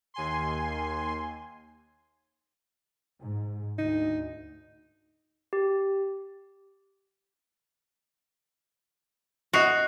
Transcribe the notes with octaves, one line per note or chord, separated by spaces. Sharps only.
D#2 G#5 C6
G#2
D2 D#4
G4
F#4 D#5 C7 F7